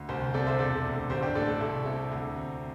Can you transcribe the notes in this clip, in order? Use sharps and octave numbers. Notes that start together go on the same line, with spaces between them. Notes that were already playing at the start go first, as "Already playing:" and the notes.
Already playing: D2
C2 G4 C5
C3 A4 D5
C5 E5
E1 A4 D5
D2
A1 G4 C5
D4 G4
A2 A4 D5
A4 D5
C2 E4 A4
C3 E4 A4
D2
C3